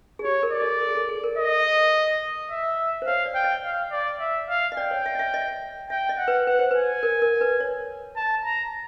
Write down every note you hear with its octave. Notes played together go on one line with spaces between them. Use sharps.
G#4
G4 C#5
A#4
D5
A4
A#4
G#4
A4
G#4
A#4
D#5
E5
C5
C#5 F5
D5
G5
D#5
F5
D5
E5
F5
D#5
D5 G5
C#5
E5
D#5
E5
D#5
E5 G5
D#5
F#5
B4
B4 F#5
C5
B4 G#5
A#4
A#4
B4
C#5
A5
A#5